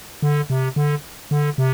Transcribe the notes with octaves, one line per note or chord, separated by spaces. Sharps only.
D3
C3
D3
D3
C3